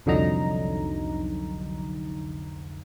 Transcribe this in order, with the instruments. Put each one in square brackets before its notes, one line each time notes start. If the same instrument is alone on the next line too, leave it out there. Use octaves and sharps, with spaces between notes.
[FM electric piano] C2 F2 D3 F#3 D#4 A#5